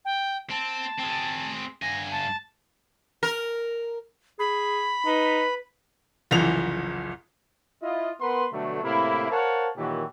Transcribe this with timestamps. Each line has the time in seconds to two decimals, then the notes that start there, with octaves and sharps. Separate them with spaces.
0.05 G5
0.51 C4 A5
0.99 C4 G#4
1.82 G2 G#5 A#6
2.11 A5
3.23 A#4
4.39 G#4 B5
5.06 D#4 B4
6.31 F#1 C2 E3 F3 G#4 F7
7.83 E4 F4 D#5
8.21 B3 A#4 B4 F#5 C6
8.53 B2 D3 F#3 G3 A3
8.83 A2 C3 A#3 E4
9.30 A#4 C5 C#5 F5 F#5 A5
9.77 A#2 D#3 E3 F#3 F#4 G4